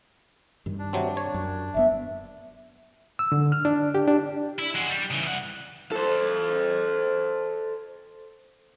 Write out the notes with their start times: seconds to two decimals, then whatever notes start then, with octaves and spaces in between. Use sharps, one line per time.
0.66 G2 D#3
0.79 D4
0.93 C3 F#3 C4
1.17 C#5
1.34 F#2
1.75 F#1 A#2 B3 E5
3.19 E6
3.32 D3
3.52 F6
3.65 D4
3.95 G4
4.07 D4
4.59 E4
4.75 G#3 F#4
4.90 G3
5.11 C#3 E3
5.26 C2 F#5
5.92 A4 C5